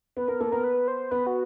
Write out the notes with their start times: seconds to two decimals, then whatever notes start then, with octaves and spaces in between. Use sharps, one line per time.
0.17 B3 B4
0.28 B3 A#4
0.40 A#3 A4
0.52 B3 A#4
0.64 B4
0.88 C5
1.11 B3 B4
1.27 F#4